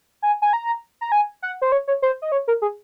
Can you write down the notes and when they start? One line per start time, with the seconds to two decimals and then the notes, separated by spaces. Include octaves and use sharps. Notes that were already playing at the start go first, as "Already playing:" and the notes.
0.22 G#5
0.42 G#5
0.53 A#5
1.01 A#5
1.12 G#5
1.42 F#5
1.62 C5
1.72 C#5
1.88 C#5
2.02 C5
2.22 D#5
2.32 C#5
2.48 A#4
2.62 G#4